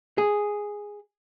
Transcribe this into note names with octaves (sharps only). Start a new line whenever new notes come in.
G#4